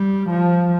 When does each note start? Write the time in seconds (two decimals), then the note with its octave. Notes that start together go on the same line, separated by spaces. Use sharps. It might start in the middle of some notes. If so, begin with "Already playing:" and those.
Already playing: G3
0.29 F3